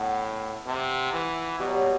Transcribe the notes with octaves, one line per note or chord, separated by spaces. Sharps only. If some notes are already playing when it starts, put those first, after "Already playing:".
Already playing: A2 B3
C3
E3
B2 G3
F#3
G3